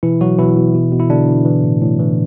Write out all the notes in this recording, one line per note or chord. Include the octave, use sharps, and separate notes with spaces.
B2 E3 E4
B2 F#3 F#4
B2 E3 E4
B2
B2
B2
E4
B2 D3 D4
B2
E3
A2
A2
E3